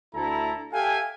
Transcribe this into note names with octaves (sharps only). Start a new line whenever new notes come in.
D2 E4 A4 A#5
G4 A4 E5 F5 G5 G#5